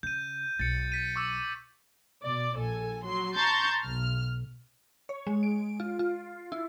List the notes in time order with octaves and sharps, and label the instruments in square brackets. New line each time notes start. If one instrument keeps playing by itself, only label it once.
[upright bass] C#3 [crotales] G6 D#7
[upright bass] B1 [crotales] A6 C#7
[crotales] A6 B6 D#7
C#6 D6 E6
[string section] B2 D5
A#1 A4 G#5
F#3 C6
A5 A#5 C6 C#6 G6 A6
B1 F6
[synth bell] C#5
G#3
D7
F4
F4
E4